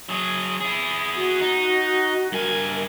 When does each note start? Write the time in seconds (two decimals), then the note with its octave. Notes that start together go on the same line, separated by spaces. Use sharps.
0.09 F#3 G#4
0.60 E4 G#4
1.16 F#4
1.41 D#4
2.32 G2 A#4 G#5